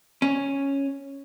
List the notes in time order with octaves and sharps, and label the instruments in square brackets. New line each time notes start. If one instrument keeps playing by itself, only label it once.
[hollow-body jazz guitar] C#4